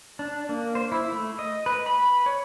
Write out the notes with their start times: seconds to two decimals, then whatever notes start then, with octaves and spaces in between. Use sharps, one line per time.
0.19 D4
0.49 A#3
0.75 C5
0.92 E4
1.12 A3
1.39 D#5
1.66 B4
1.86 B5
2.26 C#5